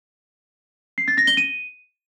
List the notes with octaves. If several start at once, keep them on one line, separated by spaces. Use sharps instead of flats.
C7
A6
A#6
G7
D#7